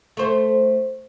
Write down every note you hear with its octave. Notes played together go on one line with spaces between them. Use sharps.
A3 C5